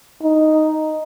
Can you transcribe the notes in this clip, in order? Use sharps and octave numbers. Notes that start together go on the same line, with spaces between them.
D#4